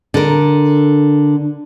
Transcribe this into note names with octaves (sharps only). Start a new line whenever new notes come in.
D3 A#4